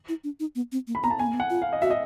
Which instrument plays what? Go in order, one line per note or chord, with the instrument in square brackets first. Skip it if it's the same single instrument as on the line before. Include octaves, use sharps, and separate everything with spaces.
[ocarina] E4
D4
D#4
B3
C4
A#3
[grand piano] B5
[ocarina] B3 [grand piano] A#5
[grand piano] A5
[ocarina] B3 [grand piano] G#5
[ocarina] A#3
B3
[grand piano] F#5
[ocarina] F4
[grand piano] F5
D#5
[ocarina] F#4 [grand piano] E5
[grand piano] D#5